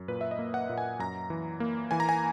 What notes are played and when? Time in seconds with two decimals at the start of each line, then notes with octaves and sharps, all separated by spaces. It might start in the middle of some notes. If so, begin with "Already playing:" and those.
Already playing: F#2
0.08 A#2 B4
0.21 E5
0.31 D#5
0.39 A#3
0.54 F#5
0.69 A#2
0.78 G#5
0.99 F#2 A#5
1.30 E3
1.60 A#3
1.91 E3 G#5
2.00 A#5
2.09 G#5